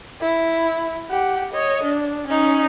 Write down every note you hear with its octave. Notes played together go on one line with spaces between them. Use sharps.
E4
G4 F#5
C#5 D#5
D4
C#4 D#4